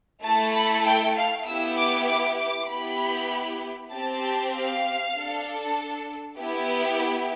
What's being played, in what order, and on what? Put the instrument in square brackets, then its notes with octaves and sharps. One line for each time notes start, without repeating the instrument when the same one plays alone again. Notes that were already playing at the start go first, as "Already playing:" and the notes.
[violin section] A3 E4 A4 A5
B5
G5
F5
B3 E4 G4 E6
D6
D6
D6
B3 E4 G4 B5
C4 G4 A5
F5
D4 A4
B3 E4 G4